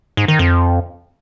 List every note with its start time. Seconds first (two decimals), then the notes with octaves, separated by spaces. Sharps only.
0.17 G#2
0.28 D#3
0.39 F2